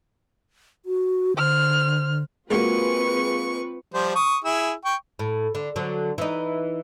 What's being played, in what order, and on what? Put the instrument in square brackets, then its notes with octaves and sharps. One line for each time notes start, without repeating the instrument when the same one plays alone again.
[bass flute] F#4
[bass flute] D3 [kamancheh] C5 F6
[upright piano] G#3 A#3 F#4 [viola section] C4 F4 B4 [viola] C#6
[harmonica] F3 G3 C5
C#6 D#6
E4 G#4 E6
G5 C#6
[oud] A2
D3
D3 F#3
E3 D#4